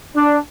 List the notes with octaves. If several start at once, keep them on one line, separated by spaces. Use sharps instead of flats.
D4